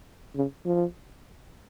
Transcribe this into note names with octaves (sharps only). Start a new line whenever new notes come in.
C#3
F3